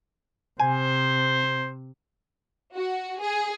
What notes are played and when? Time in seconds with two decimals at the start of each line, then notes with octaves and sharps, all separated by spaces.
0.60 C3 C5 G#5
2.75 F#4
3.20 G#4